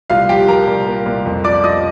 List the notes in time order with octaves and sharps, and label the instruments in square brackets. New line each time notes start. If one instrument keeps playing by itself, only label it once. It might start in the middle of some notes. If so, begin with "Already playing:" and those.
[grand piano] C2 F4 F5
F3 G4 G5
F3 A#4 A#5
C2
A#3
C2
F2
F3 D5 D6
F3 D#5 D#6